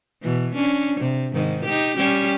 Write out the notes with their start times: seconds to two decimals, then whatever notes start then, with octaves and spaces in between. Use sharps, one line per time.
0.23 B2 E3
0.55 C#4 D4
1.00 C3
1.34 G#2 D#3
1.65 D#4 G4
1.97 G3 C#4 G4